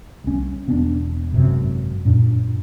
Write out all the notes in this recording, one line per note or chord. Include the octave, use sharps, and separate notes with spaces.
C2 C#4
E1 B3 C4 D4
G#1 F#2 C3
F#2 A#2 D4